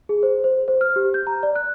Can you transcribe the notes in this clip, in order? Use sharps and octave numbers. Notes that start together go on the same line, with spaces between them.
G#4
C5
C5
C5
F6
G4
G6
A#5
D5
F#6